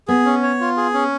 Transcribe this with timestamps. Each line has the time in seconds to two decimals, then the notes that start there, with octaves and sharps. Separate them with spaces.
0.08 B3 G#4
0.25 C#4
0.43 C#5
0.60 F4
0.77 G#4
0.94 C#4